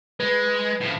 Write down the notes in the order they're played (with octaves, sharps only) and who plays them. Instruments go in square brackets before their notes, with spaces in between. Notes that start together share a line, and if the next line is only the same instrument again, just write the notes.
[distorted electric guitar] G#3 [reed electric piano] B4
[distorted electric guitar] A2 F3